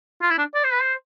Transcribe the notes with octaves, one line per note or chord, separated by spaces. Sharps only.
F4
E4
D4
D5
C5
B4
C5